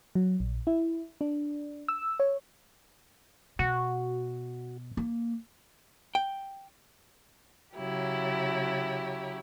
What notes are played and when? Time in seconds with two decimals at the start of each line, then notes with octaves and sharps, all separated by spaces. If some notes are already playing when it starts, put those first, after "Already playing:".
0.15 F#3
0.40 A#1
0.67 E4
1.21 D4
1.88 E6
2.20 C#5
3.59 B2 F#4
4.97 A#3
6.15 G5
7.76 C#3 F#3 E4 G4